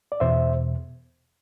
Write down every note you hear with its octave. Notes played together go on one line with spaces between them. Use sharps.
D5
E2 B2 C5 E5